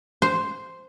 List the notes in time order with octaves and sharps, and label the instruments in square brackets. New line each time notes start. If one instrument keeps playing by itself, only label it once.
[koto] C5